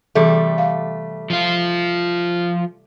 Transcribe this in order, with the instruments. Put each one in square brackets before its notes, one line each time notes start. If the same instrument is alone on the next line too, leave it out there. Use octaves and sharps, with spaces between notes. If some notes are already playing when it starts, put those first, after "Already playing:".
[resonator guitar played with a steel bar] C3 G3 A3 [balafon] E3 G#4 A4
[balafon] F5
[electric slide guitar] F3 F4